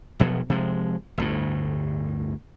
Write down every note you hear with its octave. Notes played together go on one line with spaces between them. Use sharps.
E1 B2 F3 F#3
C3 F3 G#3
G1 D2 A2